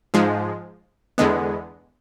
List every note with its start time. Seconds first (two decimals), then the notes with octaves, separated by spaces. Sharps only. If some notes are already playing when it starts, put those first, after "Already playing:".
0.14 G#2 F3 G#3
1.18 E2 D3 G#3 B3